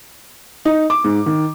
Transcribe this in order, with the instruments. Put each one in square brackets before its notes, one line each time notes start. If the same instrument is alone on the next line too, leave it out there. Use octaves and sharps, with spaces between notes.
[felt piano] D#4
D6
G#2
D#3